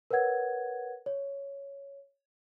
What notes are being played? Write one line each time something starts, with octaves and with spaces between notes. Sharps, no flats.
A#4 B4 C#5 F#5 G#6
C#5